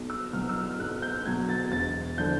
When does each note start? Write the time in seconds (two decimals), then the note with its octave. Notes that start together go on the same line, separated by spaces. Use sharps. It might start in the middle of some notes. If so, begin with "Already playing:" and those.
Already playing: B1
0.10 E6
0.33 B2 F#3 F6
0.49 E6
0.56 F6
0.79 B1 F#6
1.02 G6
1.26 B2 F#3 G#6
1.49 A6
1.72 E1 A6
2.18 D3 F3 G6